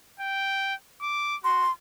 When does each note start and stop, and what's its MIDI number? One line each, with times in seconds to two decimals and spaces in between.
0.20 0.74 79
1.01 1.36 86
1.44 1.66 66
1.44 1.72 84